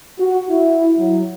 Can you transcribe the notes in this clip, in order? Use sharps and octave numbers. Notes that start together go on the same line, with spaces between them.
F#4
E4
F#3